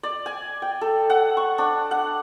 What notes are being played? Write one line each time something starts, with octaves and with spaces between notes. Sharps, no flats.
D5
G#5
G5
A4
F#5
C#6
D4
F#5